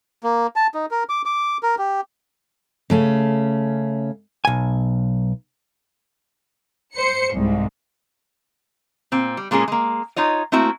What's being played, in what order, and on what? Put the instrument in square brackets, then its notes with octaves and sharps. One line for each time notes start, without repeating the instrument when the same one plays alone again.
[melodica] A#3
A5
D#4
A#4
D6
D6
A#4
G4
[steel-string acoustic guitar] C#3 A3 C#4
[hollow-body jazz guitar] B1 G#5
[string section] C5 C#7
C2 G#2
[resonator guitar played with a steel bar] A#2 C4
G3
A#2 G#3 A#3 C#4 G#4
G#3 A#3
D#4 F4 C#5 D#5
A3 A#3 C4 E4 F#4